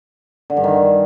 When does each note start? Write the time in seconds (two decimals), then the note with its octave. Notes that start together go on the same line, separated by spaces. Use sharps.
0.50 D3
0.57 G2
0.64 D#3